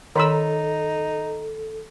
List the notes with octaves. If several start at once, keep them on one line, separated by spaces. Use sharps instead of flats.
D#3 D#4 A4 A#4 B5 C6 E6